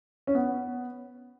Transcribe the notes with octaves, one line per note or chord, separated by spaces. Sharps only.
C#4
B3